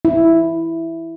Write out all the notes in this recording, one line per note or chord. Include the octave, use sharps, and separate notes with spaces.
E4